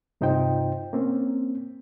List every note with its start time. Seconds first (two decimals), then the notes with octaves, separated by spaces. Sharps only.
0.21 G2 C3 D#4 F4 C5 G5
0.93 A#3 C4 C#4